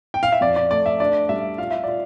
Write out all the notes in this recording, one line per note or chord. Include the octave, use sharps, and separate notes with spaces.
G5
F5
E5
F2 D5
D5
A3 D5
E5
D4 D5
G3 E5
F4 F5
E5
F4 D5